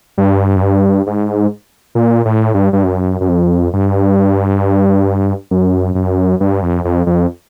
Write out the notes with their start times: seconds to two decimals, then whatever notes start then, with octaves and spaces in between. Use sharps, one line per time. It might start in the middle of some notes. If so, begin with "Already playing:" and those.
0.18 G2
0.56 F#2
0.62 G2
1.07 G#2
1.95 A#2
2.25 A2
2.54 G2
2.73 G2
2.84 F#2
3.21 F#2
3.29 F2
3.73 G2
5.51 F#2
5.95 F#2
6.40 G2
6.62 F2
6.85 F2
7.06 F2